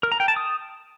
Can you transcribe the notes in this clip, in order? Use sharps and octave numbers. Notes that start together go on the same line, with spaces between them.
A#4
A#5
G5
A5
D#6